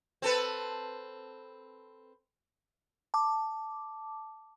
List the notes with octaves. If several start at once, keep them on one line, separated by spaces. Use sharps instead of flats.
C4 A4 B4
A5 D6